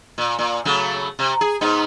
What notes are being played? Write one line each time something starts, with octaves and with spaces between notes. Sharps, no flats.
A#2
A#2
C#3 F#3 A3
C3
G#4
G#2 B3 D#4